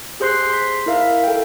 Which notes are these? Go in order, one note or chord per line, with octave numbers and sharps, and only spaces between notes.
G4 G#4 C5 C6 F#6 C7
C6 B6
E4 A#4 E5 F5
A4 G5